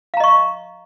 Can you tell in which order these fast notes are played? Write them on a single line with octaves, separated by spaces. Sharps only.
F5 A#5 D#5 C#6